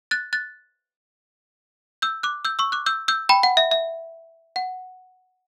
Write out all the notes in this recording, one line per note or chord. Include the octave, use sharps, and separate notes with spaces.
F#6 A6
F#6 A6
E6 G6
D6 F#6
E6 G6
C#6 E6
D6 F#6
E6 G6
E6 G6
G5 B5
F#5
E5
E5
F#5